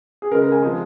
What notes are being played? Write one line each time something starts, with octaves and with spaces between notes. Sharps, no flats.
G#4
C#3 G#3 A#4
A#4
G#5
C3 F3 G#3